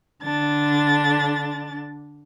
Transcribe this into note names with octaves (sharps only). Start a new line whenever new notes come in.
D3 D4 A6